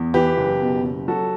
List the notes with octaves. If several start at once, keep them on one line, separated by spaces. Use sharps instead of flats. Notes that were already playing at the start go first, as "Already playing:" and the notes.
Already playing: E2
E3 G4 B4
F#1
B2
F#1
F#3 F#4 A4